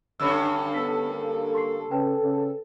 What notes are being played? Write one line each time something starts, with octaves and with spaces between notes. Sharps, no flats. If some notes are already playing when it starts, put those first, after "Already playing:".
G2 D3 C#4 B5 D6 E6
B3 A4 E6 B6
A#3
C6 C#6 C7
C#3 B4 G5 A5
C#3